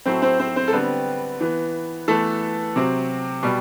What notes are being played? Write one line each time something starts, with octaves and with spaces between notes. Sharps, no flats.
A2 F#3 A3 C4 C5
C4 C5
C4 C5
C4 C5
A4
D3 G3 B3 C4 B4
E3 B3
E3 A3 B3 A4
C3 F#3 C4
B2 G3